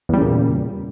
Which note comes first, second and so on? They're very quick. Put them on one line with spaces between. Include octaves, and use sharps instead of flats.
E2 G3 C#3 A#2